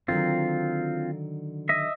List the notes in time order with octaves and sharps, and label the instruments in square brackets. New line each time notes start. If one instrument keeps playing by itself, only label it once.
[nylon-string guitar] D3 D#3 F#3 [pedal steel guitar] C4 F4
[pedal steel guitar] D#5 E5